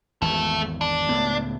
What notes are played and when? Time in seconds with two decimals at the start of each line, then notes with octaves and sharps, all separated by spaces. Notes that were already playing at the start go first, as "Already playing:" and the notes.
0.22 G#1 E2 A3 A4
0.81 D4
1.09 C#2 A2 B3